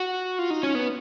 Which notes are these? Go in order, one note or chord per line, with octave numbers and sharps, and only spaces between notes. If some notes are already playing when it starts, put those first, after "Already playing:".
Already playing: F#4
F4
D#4
C#4
B3